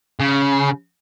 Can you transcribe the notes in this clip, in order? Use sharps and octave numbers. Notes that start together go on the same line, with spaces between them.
C#3